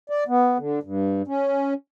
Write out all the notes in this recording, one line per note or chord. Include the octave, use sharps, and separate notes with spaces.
D5
B3
D3
G2
C#4